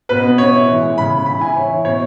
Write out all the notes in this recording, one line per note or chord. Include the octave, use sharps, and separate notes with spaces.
B2 B4
B3
B3 C#5
E4
E3
G#3
C#3 B5
C#3
E3 B5
E4 G#5
E4 C#5
E3
B2 C#5